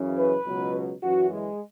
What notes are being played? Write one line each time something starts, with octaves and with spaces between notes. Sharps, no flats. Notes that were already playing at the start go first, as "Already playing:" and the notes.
Already playing: F#2 C#3 E3
B4
C#2 B2 F#3
F#2 E3 F#4
G#3